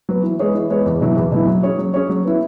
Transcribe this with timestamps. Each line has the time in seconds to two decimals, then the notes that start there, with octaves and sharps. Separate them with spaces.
0.09 F#3 B3
0.23 E3
0.39 G#3 B3 G#4 C#5
0.55 E3
0.70 G#3 B3 G#4 C#5
0.86 E2
1.01 B2 F#3 E4
1.17 E2
1.32 B2 F#3 E4
1.47 F#3
1.63 C#4 G#4 C#5
1.79 F#3
1.94 C#4 G#4 C#5
2.09 F#3
2.25 B3 E4